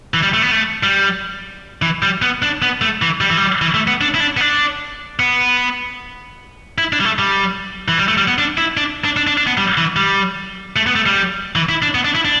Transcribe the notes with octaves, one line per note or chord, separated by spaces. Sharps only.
E3
G3
A3
B3
A3
G3
E3
G3
B3
D4
B3
A3
E3
G3
E3
G3
E3
A3
B3
D4
E4
D4
B3
D4
B3
E4
D4
G3
A3
G3
E3
G3
A3
G3
B3
D4
E4
D4
D4
D4
D4
D4
B3
G3
E3
G3
A3
B3
A3
G3
E3
E4
D4
B3
D4
E4
D4